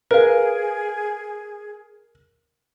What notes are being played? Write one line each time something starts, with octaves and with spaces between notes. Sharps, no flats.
G#4 A#4 B4 F5